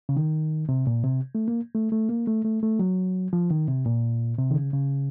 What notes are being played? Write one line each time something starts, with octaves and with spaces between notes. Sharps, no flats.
C#3
D#3
C3
A#2
C3
A3
A#3
A3
A3
A#3
A3
A3
A3
F#3
F3
D#3
C3
A#2
C3
D#3
C#3
C#3